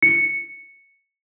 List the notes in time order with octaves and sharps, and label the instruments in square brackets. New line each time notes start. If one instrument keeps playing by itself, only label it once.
[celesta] C#7